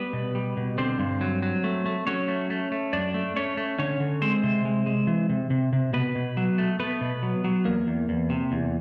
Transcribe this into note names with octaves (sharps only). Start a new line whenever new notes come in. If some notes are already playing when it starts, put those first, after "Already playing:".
Already playing: G3 B3 B4
B2
G3
B2
D3 C4 C5
G2
F#3
F#3
A3
A3
F#3 C#4 C#5
A3
A3
A3
F#2 D4 D5
A3
A3 C#4 C#5
A3
D3 C#4 C#5
D3
G#3 C4 C5
C3
G#3
G#3
E3
C3
C3
C3
B2 B3 B4
B2
F#3
A3
A3 B3 B4
B2
F#3
F#3
E2 A#3 A#4
E2
E2
C3
E2